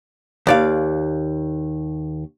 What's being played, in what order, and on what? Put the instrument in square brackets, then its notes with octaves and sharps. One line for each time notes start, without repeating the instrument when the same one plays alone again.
[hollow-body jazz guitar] D#2 D5 F5